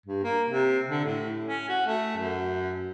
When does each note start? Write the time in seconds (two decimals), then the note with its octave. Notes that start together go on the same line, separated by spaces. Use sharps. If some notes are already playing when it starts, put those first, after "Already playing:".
0.06 G2
0.23 A#3
0.49 C3
0.88 D3
1.05 A2
1.45 C#4
1.69 F#4
1.87 A3
2.16 F#2